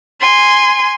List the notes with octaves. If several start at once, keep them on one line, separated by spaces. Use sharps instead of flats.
G#5 C6